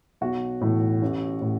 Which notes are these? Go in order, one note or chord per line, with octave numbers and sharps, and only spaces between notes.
B1 F#4
A2 E3
A1
A2